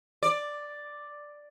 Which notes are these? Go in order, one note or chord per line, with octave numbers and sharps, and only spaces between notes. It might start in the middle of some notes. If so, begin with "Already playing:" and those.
D5